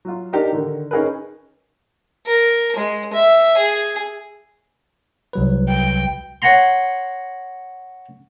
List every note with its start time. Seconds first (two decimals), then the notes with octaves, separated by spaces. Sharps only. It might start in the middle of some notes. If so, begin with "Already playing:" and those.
0.05 F#3 F4
0.33 D4 D#4 G4 A#4
0.52 D3 D#3
0.91 C#4 D#4 G#4 A#4 B4
2.27 A#4
2.76 G#3
3.13 E5
3.57 G#4
5.33 C2 F#3 B4
5.69 G5
6.42 C#5 F#5 G#5 A#5 C6